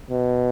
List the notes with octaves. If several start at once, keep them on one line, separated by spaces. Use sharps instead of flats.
B2